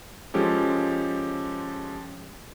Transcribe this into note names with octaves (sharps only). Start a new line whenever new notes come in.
F3 G#3 C#4 G4 A4